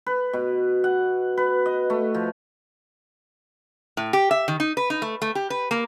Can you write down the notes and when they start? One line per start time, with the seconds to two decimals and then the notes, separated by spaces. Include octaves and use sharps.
0.06 B4
0.33 B2
0.84 F#5
1.37 B4
1.66 D#5
1.90 A3
2.14 F3
3.97 A2
4.13 G4
4.31 E5
4.48 D#3
4.60 D#4
4.77 B4
4.90 D#4
5.02 A3
5.22 A3
5.35 G4
5.50 B4
5.71 A#3